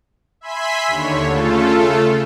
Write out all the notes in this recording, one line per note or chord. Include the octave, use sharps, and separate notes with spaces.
E5 G#5 B5 C6 B6
D#2 D3 C#5
C#3 A3 F4 A4